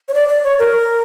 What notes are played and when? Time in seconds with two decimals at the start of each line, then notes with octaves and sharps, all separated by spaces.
0.08 C#5
0.14 D5
0.28 D5
0.44 C#5
0.59 A#4